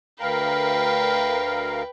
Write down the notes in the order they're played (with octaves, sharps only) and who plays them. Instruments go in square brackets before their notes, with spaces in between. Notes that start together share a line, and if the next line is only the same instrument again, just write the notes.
[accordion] D2 A#4 F5 [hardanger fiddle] B4 G5